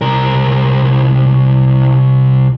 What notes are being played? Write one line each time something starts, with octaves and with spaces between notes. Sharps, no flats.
C2 A#4